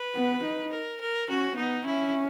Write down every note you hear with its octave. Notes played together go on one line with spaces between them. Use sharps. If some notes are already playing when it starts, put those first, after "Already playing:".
Already playing: B4
B3
D#4
A#4
A#4
C#4 F#4
B3 D#4
C#4 E4